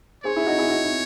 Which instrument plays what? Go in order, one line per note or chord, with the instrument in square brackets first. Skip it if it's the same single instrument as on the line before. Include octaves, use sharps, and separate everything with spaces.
[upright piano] G#4 C5 [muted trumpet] C#5
[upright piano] E4 G#4
D#4 F#4
E4 G#4
D#4 F#4
E4